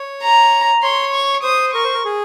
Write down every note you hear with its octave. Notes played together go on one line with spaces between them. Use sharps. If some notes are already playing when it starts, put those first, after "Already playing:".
Already playing: C#5
A#5
C#5 C6
C#6
C5 D#6
A#4 C#6
C5
A#4
G#4